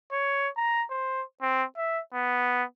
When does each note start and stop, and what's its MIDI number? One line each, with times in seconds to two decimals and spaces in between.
0.12 0.49 73
0.57 0.85 82
0.90 1.23 72
1.42 1.64 60
1.77 2.00 76
2.14 2.63 59